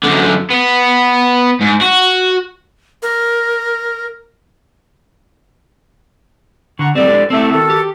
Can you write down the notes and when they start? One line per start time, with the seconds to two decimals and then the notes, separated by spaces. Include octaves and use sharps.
0.03 F#2 D3
0.51 B3
1.61 G#2
1.81 F#4
3.03 A#4
6.79 D3 F#5 A#5 C#6
6.95 G3 A3 C4 G4 A4 D5
7.08 G#3 D4
7.30 A3 C4 E4 A4 E5
7.52 D#3 F#4 A4
7.70 G4